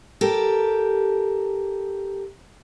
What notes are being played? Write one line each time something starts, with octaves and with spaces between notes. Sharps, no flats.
G4 A4 A#4